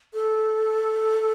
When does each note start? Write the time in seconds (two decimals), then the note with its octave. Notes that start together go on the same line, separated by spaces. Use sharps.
0.14 A4